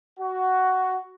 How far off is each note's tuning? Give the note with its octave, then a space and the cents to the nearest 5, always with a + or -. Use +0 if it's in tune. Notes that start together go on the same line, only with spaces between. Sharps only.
F#4 +10